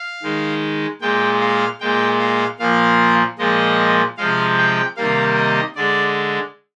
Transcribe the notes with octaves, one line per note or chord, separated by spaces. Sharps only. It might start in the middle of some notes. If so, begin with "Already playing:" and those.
Already playing: F5
D#3 G#3
A#2 G#3 G5
F5
A#2 G#3 G5
F5
A#2 F3 A#3 F5
A#2 F3 G#3 D#5
C3 F3 G#3 F5
G5
C3 D#3 G3 A#3 F5
D#5
D3 G#3 D5